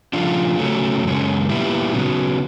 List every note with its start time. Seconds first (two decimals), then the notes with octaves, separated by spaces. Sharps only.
0.13 C#3 F3 A3 D4 F4
0.58 C#3 F#3 A3 C#4
1.04 F#2 C#3 G#3 C#4
1.49 A#2 G3 B3 E4
1.94 C#3 F#3 B3